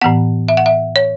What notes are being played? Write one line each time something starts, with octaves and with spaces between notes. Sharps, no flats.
A2 E3 B3 F#5
E5
F#5
E5
C#5